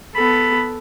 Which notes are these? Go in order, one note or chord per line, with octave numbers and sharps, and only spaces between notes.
B3 A4 B5